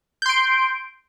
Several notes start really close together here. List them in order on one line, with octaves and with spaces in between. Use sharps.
G6 C6 D7